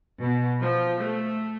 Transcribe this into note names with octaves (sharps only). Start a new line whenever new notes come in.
B2
F3
A3